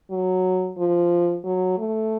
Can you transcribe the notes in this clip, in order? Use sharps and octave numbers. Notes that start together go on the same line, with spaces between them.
F#3
F3
F#3
A3